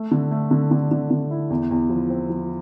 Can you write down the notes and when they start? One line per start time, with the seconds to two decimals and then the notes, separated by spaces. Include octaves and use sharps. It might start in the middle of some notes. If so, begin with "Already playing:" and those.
Already playing: A3
0.11 D3
0.31 A3
0.51 D3
0.71 D3
0.91 D3
1.11 D3
1.31 E4
1.50 E2
1.71 E2
1.90 F3
2.10 C4
2.30 F3